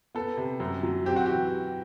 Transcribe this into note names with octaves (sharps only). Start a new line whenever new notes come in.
B3 A4
C3
F#2
F#3
C4 G4
F#4
G4
E3